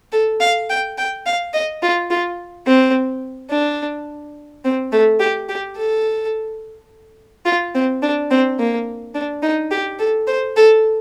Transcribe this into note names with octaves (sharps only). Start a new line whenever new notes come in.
A4
F5
G5
G5
F5
D#5
F4
F4
C4
D4
C4
A3
G4
G4
A4
F4
C4
D4
C4
A#3
D4
D#4
G4
A4
C5
A4